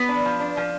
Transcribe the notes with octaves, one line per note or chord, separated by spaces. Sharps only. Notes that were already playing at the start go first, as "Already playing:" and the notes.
Already playing: B3 B4
D4
F3
D4
F3